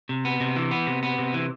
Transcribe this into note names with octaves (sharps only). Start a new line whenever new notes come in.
C3
B3
C3
E3
B3
C3
B3
C3
E3